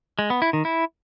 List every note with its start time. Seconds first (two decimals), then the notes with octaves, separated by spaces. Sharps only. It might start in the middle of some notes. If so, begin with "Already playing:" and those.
0.19 G#3
0.30 B3
0.42 E4
0.53 D#3
0.65 E4